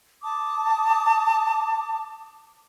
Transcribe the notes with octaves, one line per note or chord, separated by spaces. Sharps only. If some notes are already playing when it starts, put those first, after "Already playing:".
A5 D6 D#6